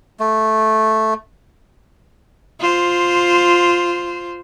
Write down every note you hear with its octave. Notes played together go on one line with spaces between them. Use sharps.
A3
F4 C5